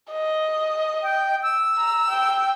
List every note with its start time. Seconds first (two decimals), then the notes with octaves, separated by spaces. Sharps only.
0.11 D#5
1.03 G5
1.43 E6
1.78 A#5
2.09 G5